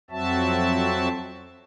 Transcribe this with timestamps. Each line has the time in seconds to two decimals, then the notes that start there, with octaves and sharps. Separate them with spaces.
0.11 F2 F#3 C4 F#4 E5 A5